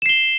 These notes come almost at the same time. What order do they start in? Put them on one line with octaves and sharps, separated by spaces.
E7 C7 G7